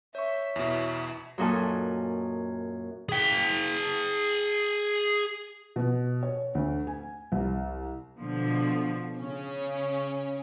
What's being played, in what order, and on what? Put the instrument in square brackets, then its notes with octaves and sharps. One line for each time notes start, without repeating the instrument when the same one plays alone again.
[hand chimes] C#5 C#6 [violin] E5
[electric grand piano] E2 B2 [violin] E4 E5
[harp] F#2 A#2 D#4 F#4 A4 G#5
[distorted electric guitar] G#4 G5
[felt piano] B2
C#5
D2
G#5
C2
[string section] B2 D3 F3
C#3 C#4